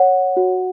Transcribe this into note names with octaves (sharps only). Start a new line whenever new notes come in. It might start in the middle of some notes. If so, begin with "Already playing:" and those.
Already playing: C#5 F#5
F#4